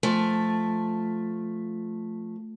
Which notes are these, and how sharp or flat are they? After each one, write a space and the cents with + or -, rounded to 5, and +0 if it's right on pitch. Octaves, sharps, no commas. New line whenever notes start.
F3 +0 A3 +0